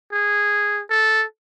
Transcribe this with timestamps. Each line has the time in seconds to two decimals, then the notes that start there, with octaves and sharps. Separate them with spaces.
0.12 G#4
0.90 A4